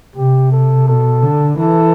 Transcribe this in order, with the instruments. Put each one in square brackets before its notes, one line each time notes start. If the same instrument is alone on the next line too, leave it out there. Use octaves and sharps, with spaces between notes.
[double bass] C3 [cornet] G4
[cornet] A4
[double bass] B2 [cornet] A4
[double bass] D3
[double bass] E3 [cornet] A4